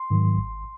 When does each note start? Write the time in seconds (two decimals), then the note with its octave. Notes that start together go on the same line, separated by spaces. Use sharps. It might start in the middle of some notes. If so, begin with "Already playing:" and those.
Already playing: C6
0.10 G#2 D#3 F#3
0.37 G#1